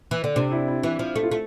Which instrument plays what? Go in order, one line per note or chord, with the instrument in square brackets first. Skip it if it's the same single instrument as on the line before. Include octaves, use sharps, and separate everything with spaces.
[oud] E3
D3
[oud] C3 [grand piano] D4
[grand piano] E4
E4
[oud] E3 [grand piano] E4
[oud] F3
A3
[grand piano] F4
[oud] A3